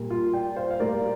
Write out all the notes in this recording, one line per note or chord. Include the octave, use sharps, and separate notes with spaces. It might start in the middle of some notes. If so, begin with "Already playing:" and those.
Already playing: A#2 G3 A#3
F4
D5 G5
C5 F5
F5
A#2 G3 A#3 A#4 D5